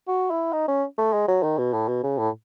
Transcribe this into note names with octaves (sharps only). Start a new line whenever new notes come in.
F#4
E4
D#4
C#4
A3
G#3
F#3
D#3
B2
A2
B2
C#3
A2